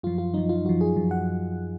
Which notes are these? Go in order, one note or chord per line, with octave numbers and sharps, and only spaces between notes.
F#2 F3 F4
F4
F#2 F3 D#4
F4
F#2 F3 F#4
G#4
F#2 F3
F#5